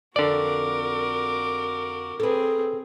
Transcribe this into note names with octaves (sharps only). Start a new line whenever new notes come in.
F2 D3 F#4 A#4 D5 D6
C4 G#4 A4 B4